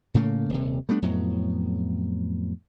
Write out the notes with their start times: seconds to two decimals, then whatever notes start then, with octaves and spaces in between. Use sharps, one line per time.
0.14 A2 C#3 A3 A#3
0.50 D#1 C3
0.89 G3 A3 B3 D4
1.02 F2 A2 F#3 B3